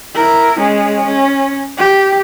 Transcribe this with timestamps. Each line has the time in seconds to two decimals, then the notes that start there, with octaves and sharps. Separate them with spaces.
0.15 E4 A#4
0.58 G#3 C#4
1.06 C#4
1.78 G4